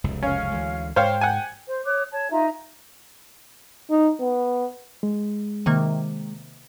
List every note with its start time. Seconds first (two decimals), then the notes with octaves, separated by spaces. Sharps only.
0.04 F1 C#2 F#2
0.23 C#4 F5
0.51 D2 E3 G#3
0.96 G#2 C5 C#5 F5 G5
1.21 F#5 G#5
1.66 C5
1.85 C#5 D6 D#6 F#6
2.12 C#5 A5 G#6
2.31 D#4 F4 E5 A#5
3.90 D#4
4.20 B3
5.03 G#3
5.66 C3 D#3 A#3